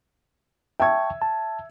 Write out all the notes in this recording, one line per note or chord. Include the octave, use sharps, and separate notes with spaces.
E5 G5 A5 C#6 G#6
A5